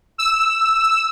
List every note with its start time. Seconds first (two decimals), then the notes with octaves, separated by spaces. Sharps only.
0.18 E6